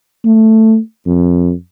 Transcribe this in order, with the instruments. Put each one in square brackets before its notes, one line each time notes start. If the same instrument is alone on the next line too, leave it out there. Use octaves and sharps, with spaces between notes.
[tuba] A3
F2